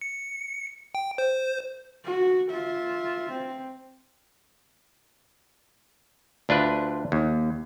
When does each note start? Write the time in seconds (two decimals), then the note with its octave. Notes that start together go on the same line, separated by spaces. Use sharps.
0.01 C#7
0.95 G5
1.18 C5
2.05 F#4
2.50 F4 E5
3.31 C4
6.49 D2 D4 F4 B4
7.12 D#2